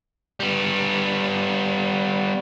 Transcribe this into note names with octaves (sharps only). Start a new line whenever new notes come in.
G3 B3